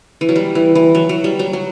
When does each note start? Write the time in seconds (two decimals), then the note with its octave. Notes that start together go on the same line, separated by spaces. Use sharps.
0.21 E3
0.29 F#3
0.36 G3
0.55 E3
0.75 E3
0.95 F#3
1.09 F#3
1.24 G3
1.39 F#3
1.53 F#3